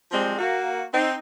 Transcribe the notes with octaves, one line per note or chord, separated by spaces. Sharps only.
F3 G3 G#3 C4
A#3 F#4
C4 D#4